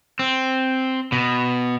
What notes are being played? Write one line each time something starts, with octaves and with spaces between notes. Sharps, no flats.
C4
B2